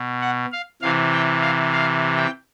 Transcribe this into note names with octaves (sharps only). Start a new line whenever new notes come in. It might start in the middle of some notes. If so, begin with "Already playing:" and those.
Already playing: B2
F#5
F5
C3 E3 F5
G5
F5
F5
G5